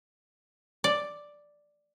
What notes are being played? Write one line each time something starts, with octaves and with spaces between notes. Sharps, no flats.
D5